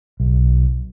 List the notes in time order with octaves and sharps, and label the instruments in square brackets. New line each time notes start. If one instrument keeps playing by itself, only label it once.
[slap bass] B1